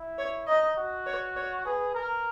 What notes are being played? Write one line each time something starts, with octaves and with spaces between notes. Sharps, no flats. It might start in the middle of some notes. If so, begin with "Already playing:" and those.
Already playing: E4
C#5
D#4 D#5
F#4
C#5
C#5
G#4 B4
A#4